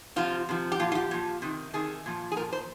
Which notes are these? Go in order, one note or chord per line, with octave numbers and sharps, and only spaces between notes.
C3 F3 F4
C3 F3
G4
A#2 F3 F4
F4
G4
A#2 F3
C3 D#3
C3 D#3 G#4
A#2 F3
G#4
A#2 F3 A#4
C5